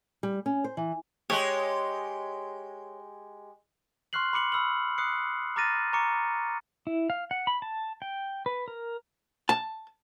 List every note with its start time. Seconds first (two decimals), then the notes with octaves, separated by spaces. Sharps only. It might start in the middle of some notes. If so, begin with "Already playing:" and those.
0.23 G3
0.46 C#4
0.64 C5
0.77 E3
1.30 G#3 G4 C#5
4.13 C6 C#6 F6 F#6 C7 F#7
4.33 B5 D6 C#7 F#7
4.52 B5 E6 F6 F#7
4.98 D#6 F#6 C7 C#7
5.56 A#5 D6 F6 A6 A#6 D#7
5.93 A#5 C#6 D6 C#7
6.87 E4
7.10 F5
7.31 F#5
7.47 B5
7.62 A5
8.02 G5
8.46 B4
8.68 A#4
9.49 A5